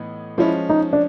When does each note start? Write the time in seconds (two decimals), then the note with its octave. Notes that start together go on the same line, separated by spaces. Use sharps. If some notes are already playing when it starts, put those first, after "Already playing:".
Already playing: A2 E3 B3 D#4
0.38 F3 G#3 C#4 E4
0.70 D#4
0.93 D4